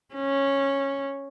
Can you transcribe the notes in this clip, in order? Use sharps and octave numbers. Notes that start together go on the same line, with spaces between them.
C#4